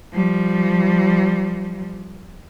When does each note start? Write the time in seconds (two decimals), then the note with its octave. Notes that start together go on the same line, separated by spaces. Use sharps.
0.13 F3 G3